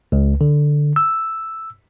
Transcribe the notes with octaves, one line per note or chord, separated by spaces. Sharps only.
C#2
D3
E6